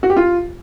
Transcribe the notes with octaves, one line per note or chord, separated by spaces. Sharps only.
F#4
G4
F4